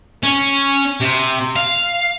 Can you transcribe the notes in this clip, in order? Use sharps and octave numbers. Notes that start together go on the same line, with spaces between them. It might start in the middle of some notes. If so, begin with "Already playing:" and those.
C#4
C3
F5